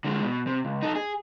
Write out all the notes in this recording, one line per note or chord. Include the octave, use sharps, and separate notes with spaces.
D3 G#3
B2
C3
C#2
D#4 A4
G#4